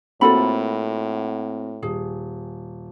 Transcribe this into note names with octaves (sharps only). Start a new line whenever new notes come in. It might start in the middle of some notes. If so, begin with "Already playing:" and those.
A2 A#3 C4 F4 F#4 A4 B5
D#1 G#4